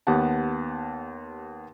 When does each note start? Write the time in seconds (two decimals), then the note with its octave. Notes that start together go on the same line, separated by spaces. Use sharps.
0.07 D#2 B3 G4 F#5 A5